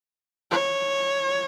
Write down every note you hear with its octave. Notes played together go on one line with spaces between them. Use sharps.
C#5